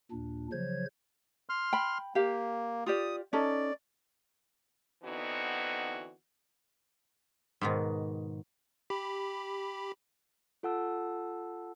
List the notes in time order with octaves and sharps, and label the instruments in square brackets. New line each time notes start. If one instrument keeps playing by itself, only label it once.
[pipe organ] D#2 A#2 D4
C#3 F3 F#3 C5 C#5 G#6
[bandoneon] C6 F6
[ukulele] G5 B5
[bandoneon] A#3 [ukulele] G4 F5
[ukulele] F4 G4 D5 [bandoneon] D#6
[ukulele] C#4 D#4 A4 [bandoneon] D5
[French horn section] D3 E3 B3 C4 D#4 F#4
[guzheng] G#2 B2 D#3
[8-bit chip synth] G4 B5
[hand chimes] F4 A4 F#5 A5 E6